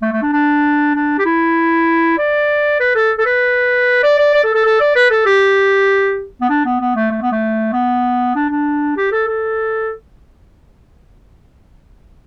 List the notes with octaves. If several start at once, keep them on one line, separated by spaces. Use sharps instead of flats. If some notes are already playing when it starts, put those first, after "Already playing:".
A3
A3
D4
D4
D4
G4
E4
D5
B4
A4
A4
B4
D5
D5
D5
A4
A4
A4
D5
B4
A4
G4
B3
D4
B3
B3
A3
A3
B3
A3
B3
D4
D4
G4
A4
A4